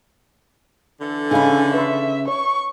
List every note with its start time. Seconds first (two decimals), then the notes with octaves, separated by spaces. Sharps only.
0.99 D3 E3 A4
1.31 C#3 C#4 D#4 F5 G#5 B5
1.74 B4 E5 C6
2.28 C#5 C#6